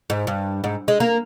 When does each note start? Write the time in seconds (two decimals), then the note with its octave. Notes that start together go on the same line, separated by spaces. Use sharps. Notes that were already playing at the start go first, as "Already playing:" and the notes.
0.10 G#2
0.27 G2
0.64 G#2
0.88 G#3
1.00 A#3